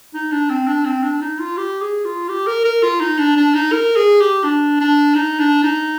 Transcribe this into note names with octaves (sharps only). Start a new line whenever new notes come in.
D#4
D4
C4
D4
C4
D4
D#4
F4
G4
G#4
F4
G4
A#4
A#4
F4
D#4
D4
D4
D#4
A#4
G#4
G4
D4
D4
D#4
D4
D#4